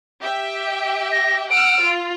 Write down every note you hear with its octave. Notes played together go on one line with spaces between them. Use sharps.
G4 E5 G5
A#6
F#5 E6 F6 D7
F4